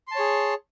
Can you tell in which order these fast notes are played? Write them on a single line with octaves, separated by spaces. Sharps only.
C6 A5 C#5 G#4